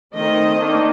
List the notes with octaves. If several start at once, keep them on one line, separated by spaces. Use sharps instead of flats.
D#3 A3 C4 D#5
D#3 A#3 D4